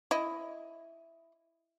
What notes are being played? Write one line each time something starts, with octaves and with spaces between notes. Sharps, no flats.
E4 D#5